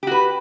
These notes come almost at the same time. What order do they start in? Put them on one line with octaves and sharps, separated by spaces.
G4 F#4 B4